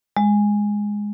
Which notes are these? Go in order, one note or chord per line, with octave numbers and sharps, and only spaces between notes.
G#3